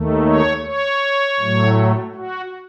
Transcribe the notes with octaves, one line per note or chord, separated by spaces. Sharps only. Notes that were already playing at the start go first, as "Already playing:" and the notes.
Already playing: D#2 D#3 A3
C#5
C#5
A2 F#3 A3
F#4